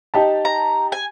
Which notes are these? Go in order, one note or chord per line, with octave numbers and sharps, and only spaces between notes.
D#4 G4 A5
A#5
G#5